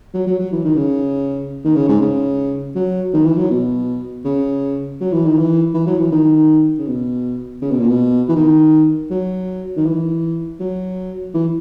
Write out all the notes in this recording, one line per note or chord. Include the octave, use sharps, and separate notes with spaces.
F#3
F#3
F#3
E3
D#3
C#3
D#3
C#3
G#2
C#3
F#3
D#3
E3
F#3
B2
C#3
F#3
E3
D#3
E3
E3
F#3
E3
D#3
C#3
B2
C#3
B2
A#2
B2
E3
D#3
F#3
D#3
E3
F#3
E3